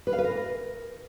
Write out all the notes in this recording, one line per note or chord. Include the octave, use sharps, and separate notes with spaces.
B4
F5
B4
A#4